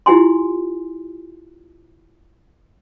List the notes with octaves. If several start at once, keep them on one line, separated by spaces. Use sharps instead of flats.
E4 F4 G4 G#5 C6